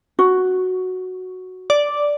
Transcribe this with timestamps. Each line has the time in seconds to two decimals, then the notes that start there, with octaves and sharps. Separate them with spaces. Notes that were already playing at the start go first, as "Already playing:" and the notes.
0.19 F#4
1.70 D5